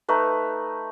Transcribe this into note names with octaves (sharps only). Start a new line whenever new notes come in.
A3 D#4 B4